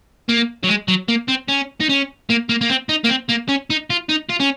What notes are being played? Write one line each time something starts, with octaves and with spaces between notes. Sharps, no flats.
A#3
F#3
G#3
F#3
A#3
C4
C#4
D#4
C#4
A#3
A#3
A#3
C4
D#4
A#3
C4
A#3
C#4
D#4
F4
D#4
F4
C#4